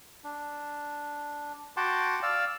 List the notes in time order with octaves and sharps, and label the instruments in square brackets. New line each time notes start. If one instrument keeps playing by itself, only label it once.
[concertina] D4
F#4 F#5 G5 A5 C6 D6
D5 F5 E6